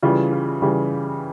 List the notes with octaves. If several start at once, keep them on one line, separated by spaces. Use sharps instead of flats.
C#3 E3 G3 F4
F4
C#3 E3 G3